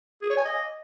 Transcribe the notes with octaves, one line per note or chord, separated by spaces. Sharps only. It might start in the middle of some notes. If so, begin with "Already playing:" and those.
G#4
C#5
G#5
D#5